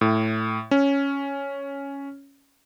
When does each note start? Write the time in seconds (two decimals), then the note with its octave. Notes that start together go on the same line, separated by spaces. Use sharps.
0.01 A2
0.71 C#4